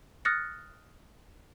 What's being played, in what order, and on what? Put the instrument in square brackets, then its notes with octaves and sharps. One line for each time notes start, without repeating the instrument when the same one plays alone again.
[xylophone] D#6 F6 F#6 A6 A#6 C#7